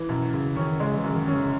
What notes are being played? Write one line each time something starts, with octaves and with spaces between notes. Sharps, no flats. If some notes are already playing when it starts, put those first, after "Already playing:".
Already playing: E3
F#2 B2
F#2 C#3
D#3 C#4
C#3 G#3
E3
F#2
C#3
D#3
C#4
C#3
C#3